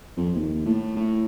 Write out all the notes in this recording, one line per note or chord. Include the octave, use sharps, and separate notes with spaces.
F2
D#2
A2
A2